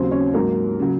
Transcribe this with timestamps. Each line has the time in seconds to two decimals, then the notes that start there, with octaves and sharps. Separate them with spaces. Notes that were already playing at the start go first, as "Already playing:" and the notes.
Already playing: D#2 C#3 F#3 C4 C5
0.11 C#4 C#5
0.34 G#2 F#3 A#3 A#4
0.79 C#3 F#3